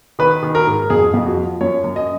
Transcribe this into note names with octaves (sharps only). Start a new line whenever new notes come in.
D#3 B4
D#3
A#4
G#2
F2 G#4
F2
F#4
F3
F#2 C#5
F#2
D#5